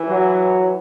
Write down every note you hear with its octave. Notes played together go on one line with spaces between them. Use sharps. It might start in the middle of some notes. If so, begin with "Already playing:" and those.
Already playing: E3
F#3